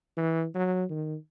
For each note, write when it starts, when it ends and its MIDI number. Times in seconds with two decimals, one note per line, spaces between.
0.17 0.46 52
0.55 0.85 54
0.90 1.15 51